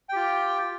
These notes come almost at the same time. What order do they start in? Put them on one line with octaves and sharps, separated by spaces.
G5 G4 F4